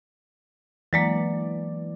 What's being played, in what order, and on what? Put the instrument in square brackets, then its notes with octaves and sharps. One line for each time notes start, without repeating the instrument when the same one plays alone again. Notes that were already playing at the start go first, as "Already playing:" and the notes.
[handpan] E3 D5 [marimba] F#3 G#3 A#3